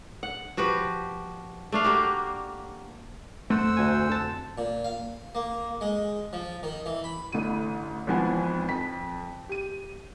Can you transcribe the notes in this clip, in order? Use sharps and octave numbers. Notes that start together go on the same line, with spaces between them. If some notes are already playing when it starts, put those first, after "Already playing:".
F#5
F3 F#4 G4 B4
A3 D4 F5
A#3 F#4 G4
F2 A3 C5 F#5 E6
D2 G#5
A5
A#2
F5
A#3
G#3
F3
D#3
E3
B5
A1 D3 E4 D#7
G#1 E3 F3 B3 G#5
F2 B6
G4 D#7